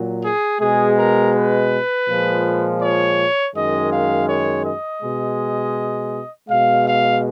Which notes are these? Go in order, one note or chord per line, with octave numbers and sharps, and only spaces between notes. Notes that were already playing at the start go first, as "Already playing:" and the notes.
Already playing: A#2 F#3
G#4
B2 G#3 G#4
A#4
B4
A#2 F3 G#3
C#5
F#2 D#3 G#3 D#5
F5
C#5
D#5
B2 G#3
B2 G#3 F5
F5